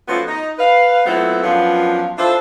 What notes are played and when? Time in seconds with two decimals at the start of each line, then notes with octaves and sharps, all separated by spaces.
0.08 F3 A3 B3 C#4 F4 F#4
0.28 D#4
0.59 B4 F5
1.06 F#3 A3 B3 C4 E4 F4
1.44 F#2 F3 B3 D4 F4
2.18 D4 E4 F4 A4 C5